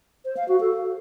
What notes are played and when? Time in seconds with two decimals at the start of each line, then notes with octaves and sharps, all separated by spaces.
0.25 C5
0.37 F5
0.49 F#4
0.60 A4